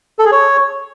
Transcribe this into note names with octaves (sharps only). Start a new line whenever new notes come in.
A4
G#4
C#5